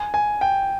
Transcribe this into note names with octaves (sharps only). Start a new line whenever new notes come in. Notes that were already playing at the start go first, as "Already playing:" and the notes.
Already playing: G#5
G#5
G5